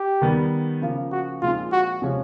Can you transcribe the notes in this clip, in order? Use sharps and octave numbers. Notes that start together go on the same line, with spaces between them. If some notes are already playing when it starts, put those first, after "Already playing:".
Already playing: G4
D#3 G3 B3
C#3 F3 A#3
F#4
A#2 F3 G#3 C4 D#4 F4
F#4
C3 F3 G#3 C#4